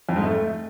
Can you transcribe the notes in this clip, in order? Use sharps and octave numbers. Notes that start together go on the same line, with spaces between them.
F2
G#2
A3